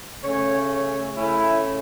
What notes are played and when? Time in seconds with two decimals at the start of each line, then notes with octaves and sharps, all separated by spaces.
0.24 C#3 A3 C#4 C#5
0.71 C#5
1.17 C#3 A3 C#4 E4